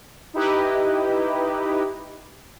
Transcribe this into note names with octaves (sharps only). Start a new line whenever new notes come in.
D#4 E4 G4 B4 D#5